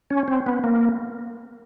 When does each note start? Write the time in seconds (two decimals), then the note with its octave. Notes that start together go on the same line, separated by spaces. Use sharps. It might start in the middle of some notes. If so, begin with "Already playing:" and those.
0.10 C#4
0.28 C4
0.46 B3
0.64 A#3